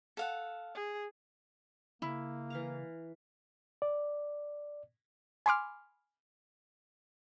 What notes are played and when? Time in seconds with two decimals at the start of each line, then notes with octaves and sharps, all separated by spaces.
0.17 A4 F5 F#5
0.74 G#4
2.02 C#3 A#3 E4
2.50 E3 F5 A#5
3.82 D5
5.46 G#5 B5 C6 D6 F6